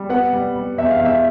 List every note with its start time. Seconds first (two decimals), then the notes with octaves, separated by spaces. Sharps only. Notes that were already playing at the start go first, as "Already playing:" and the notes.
Already playing: G3
0.09 B3 F#5
0.33 G3
0.56 G3
0.78 E2 E5
0.91 F5
1.00 E2 E5